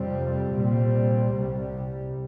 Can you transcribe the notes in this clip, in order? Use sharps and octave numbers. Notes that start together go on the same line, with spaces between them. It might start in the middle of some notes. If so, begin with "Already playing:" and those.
Already playing: F2 C3 G3 C4
C2 A#2 G3 C4
C2 C3 G3